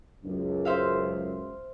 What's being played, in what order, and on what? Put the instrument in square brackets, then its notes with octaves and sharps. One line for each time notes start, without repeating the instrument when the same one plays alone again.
[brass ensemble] C#2 F#2
[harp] C5 E5 F5